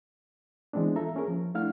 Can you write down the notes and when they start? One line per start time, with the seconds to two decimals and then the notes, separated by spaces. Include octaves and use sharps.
0.73 E3 G#3 B3 C4 D4
0.96 F4 A4 E5 A#5
1.15 A#3 C#4 G#4 A#4
1.28 F3
1.54 A3 D4 E4 F5 F#5 F6